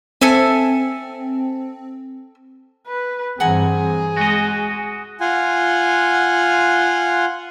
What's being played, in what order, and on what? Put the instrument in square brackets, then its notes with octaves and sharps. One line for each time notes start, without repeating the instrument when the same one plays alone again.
[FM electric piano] C4 [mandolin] A4 E5 G#5
[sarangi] B4
[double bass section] G2 E3 C4 [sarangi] G#4 [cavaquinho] F#5 G#5 A#5
[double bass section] G#3 [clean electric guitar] F#4 D#5
[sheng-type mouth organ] F4 F#5 G#5